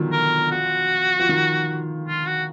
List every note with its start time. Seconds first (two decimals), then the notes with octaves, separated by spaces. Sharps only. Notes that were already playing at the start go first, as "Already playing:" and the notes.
Already playing: B2 D3 D#3 F3 F#3
0.12 A#4
0.51 F#4
1.19 F3
1.29 D#3
2.08 F4
2.26 F#4